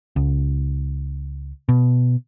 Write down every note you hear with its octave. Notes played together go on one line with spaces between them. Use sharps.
C#2
B2